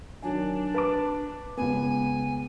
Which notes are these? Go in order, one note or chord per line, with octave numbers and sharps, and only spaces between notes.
D#3 F#3 D4 G#5
B4 A5 D6
C#2 B3 G#5